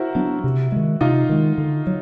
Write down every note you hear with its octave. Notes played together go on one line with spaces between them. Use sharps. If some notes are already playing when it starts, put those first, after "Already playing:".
Already playing: E4 F#4 A#4 C5
F#3 B3 D4
C3
D#3 G#3
C3 D#4 F4
D#3 G#3
D3
F#3